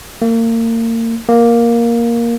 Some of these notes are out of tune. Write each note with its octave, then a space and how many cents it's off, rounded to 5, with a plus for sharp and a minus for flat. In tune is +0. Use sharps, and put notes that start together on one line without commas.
A#3 -35
A#3 +5